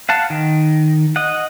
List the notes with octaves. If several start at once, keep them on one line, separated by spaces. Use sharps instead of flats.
F5 F#5 A5
D#3
D#5 F#5